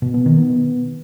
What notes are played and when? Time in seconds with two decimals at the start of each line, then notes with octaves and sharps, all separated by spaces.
0.02 B2
0.14 B3
0.26 D#3
0.38 B3